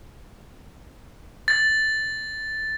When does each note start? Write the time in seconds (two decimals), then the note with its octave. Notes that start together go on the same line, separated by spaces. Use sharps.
1.48 A6